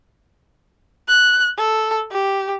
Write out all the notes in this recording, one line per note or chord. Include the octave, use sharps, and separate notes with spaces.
F#6
A4
G4